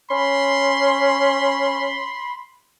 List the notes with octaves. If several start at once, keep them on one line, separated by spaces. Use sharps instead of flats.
C#4 B5 C6